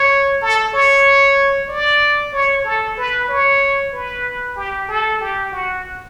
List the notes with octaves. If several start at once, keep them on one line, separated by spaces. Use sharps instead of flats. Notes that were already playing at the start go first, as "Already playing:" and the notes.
Already playing: C#5
A4
C#5
D5
C#5
A4
B4
C#5
B4
G4
A4
G4
F#4